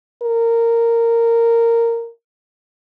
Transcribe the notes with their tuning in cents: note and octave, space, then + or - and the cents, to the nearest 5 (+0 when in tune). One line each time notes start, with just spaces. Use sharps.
A#4 -10